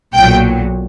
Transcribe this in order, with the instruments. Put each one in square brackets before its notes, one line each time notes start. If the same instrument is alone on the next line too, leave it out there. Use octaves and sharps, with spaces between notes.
[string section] B1 A#2 F#3 G5